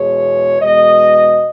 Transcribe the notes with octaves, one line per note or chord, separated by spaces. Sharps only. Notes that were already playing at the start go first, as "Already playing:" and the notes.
Already playing: E2 B2 G#3 C#5
E2 B2 G#3 D#5